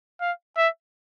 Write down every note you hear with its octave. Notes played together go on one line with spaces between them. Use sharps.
F5
E5